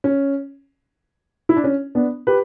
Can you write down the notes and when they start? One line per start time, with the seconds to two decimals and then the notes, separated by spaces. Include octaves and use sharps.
0.04 C#4
1.49 E4
1.56 D4
1.64 C#4
1.95 B3 D4
2.27 G4 B4